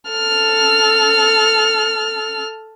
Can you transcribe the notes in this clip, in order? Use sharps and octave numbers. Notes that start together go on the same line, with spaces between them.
A4 F6